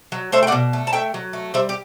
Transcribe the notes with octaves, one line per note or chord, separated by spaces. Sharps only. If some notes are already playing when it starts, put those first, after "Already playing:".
F#3
A3 C5 E5
G5
D5 F#5
B2
A3
A5
A3 E5 G5
F#3
A3
G3 C5 E5
G4